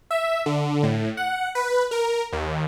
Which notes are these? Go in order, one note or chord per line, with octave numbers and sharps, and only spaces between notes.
E5
D3
A2
F#5
B4
A#4
D#2